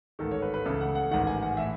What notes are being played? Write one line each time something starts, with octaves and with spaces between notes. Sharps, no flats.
A1 G#2 D#3 A4
C#5
B4
B4
C#2 C#3 E3 A4
F#5
F#5
A1 G#2 D#3 F#5
G#5
F#5
A2 E3 E5